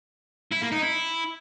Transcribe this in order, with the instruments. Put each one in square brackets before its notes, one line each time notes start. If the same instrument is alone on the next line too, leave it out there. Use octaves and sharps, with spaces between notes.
[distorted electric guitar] E4
A#3
D#4
E4